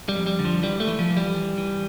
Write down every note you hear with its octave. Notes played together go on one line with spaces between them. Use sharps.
G3
F2
G3
D3
F3
E3 G3
A3
E3
F3
E3
G3
E3
E3